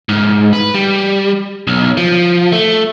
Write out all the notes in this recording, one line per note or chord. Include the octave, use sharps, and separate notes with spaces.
G#2
B4
G3
B1
F3
A3